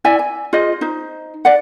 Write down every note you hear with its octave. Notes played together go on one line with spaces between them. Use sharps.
E4 D5 E5 G#5
G#5
F4 G#4 C5 D#5
D#4 C5
D5 F#5